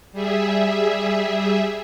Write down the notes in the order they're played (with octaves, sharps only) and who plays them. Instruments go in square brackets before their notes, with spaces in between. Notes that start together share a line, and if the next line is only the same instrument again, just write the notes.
[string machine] G3 G#4 E5